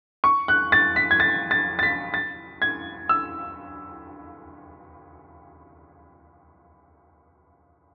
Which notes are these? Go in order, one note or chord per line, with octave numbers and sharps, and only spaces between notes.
C#6
F#6
A6
B6
G#6
A6
A6
A6
B6
A6
G#6
E6